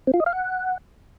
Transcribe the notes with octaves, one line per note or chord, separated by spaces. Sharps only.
C4
F4
D#5
F5
F#5